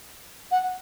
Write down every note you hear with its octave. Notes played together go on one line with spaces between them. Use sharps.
F#5